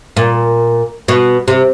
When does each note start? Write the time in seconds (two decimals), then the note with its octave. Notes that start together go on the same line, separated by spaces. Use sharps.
0.17 A#2
1.08 B2
1.48 C3